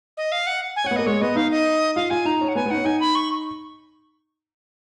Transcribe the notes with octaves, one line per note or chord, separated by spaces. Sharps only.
D#5
F5
F#5
G#5
C#4 F#5
B3
A#3 D#5
G#3 C#5
B3 D#5
D#4 F5
D#5
F4 F5
F4 G#5
D#4 A#5
C#4
F#5
B3 G#5
B3 D#4 F#5
C#4
D#4 G#5
B5
C#6